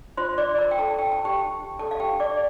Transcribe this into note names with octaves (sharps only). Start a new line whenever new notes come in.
F4 C5 C6
D5 D6
A#4 A#5
G5
A4 A5
G5
A5
G4 G5
A4 A5
F5
G4 G5
D5 D6